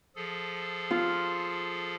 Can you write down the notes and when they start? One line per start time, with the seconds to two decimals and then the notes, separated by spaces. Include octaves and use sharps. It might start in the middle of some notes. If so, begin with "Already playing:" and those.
0.16 F3 G#4 A4
0.91 F4